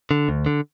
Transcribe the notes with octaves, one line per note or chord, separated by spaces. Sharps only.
D3
D2
D3